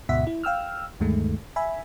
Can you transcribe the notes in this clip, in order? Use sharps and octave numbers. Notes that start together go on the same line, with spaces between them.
D2 G#2 B2 E5 F#5 B6
E4
F5 G5 E6 F6
D2 G2 D#3 G#3 A3
E5 G#5 B5